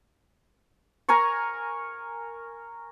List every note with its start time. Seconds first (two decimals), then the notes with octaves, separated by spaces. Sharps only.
1.09 A#4 G#5 A#5 C#6